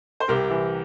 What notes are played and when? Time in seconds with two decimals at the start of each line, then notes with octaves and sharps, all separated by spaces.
0.20 C5
0.28 C2 G4 A#4
0.50 E3